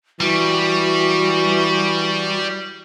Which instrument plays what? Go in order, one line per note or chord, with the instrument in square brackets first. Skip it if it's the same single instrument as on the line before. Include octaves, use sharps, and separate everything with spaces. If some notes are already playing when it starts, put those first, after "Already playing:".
[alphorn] E3 [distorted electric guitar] G3 [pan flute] F#4